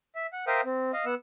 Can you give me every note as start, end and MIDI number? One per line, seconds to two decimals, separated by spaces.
0.15 0.27 76
0.33 0.45 78
0.47 0.61 70
0.47 0.61 72
0.47 0.61 76
0.47 0.61 77
0.47 0.61 79
0.47 0.61 87
0.65 0.92 60
0.93 1.05 75
0.93 1.05 77
1.06 1.15 59
1.06 1.15 78
1.06 1.15 88